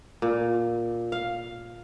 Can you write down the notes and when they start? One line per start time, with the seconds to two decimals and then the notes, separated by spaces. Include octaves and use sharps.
0.22 A#2
1.12 F5